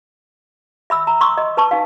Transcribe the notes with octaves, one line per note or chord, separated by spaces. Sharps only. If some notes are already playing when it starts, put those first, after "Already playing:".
E5 B5 E6
A#5
C6 C#6 D#6 E6
D#5
B4 A5 C#6
D#4 F5